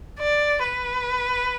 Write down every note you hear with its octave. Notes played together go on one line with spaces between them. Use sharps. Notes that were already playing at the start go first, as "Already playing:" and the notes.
D5
B4